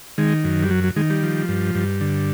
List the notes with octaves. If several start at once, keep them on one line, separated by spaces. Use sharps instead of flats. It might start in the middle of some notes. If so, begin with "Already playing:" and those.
D#3 G#3
F#2
G3
F#3
F#3
D#3 G#3
G3
F3
G2
G2
D3